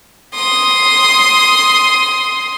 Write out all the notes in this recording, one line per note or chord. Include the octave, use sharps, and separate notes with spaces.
C6 D#6